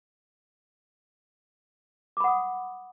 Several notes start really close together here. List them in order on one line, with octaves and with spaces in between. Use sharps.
D6 B5 F#5 D#6